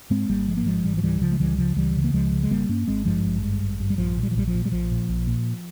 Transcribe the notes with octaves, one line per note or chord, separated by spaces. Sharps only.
G#2 G#3 C4
G#1 G3 A#3
G#2 F3 G#3
A#3
G#1 F3 G#3
G#2 E3 G3
F3
C#2 E3 G3
C#3 F3
G#3
C#2 E3 G3
C#3 F3
C#2 E3 G3
C#3
A#3
C#2 F3 G#3
C#3
G#3
G#1 G3 A#3
G2 A#3 C#4
G#1 G#3 C4
G2 F3 G#3
G#1
G2
G#1
G2
G3
A#1 F3
A#2
G3
F3
A#1 E3 G3
F3
A#2
G3
A#1 F3
A#2
A#1
A#2